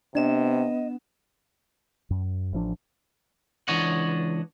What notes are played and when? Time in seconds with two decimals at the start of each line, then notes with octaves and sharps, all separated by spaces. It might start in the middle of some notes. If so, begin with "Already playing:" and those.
0.15 C3 B3 D4 D#5 E7
2.10 F#2
2.53 A1 F3 D4
3.68 C#2 E3 D4 C#5 D#5 F#5